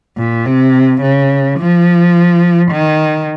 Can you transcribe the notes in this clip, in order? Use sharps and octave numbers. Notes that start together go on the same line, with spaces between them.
A#2
C3
C#3
F3
D#3